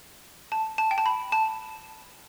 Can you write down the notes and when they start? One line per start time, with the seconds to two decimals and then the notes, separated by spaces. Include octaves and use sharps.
0.52 A5
0.78 A5
0.91 G5
0.98 A5
1.06 B5
1.32 A5